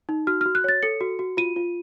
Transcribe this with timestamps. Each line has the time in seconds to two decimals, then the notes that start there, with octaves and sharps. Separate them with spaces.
0.09 D#4
0.27 F#4 F6
0.41 F#4 F6
0.55 F#6
0.64 C#5 A6
0.83 A4 C#7
1.01 F#4
1.19 F#4
1.37 F4 D#7
1.56 F4